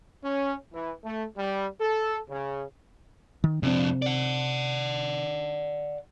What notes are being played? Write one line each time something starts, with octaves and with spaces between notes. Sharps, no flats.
C#4
E3
A3
G3
A4
C#3
D#3
F2 C3 C4 D4
D5 F#5